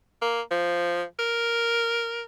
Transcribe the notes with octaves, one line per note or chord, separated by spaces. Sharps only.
A#3
F3
A#4